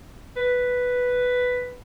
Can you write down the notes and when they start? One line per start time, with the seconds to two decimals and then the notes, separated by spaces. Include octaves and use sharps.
0.37 B4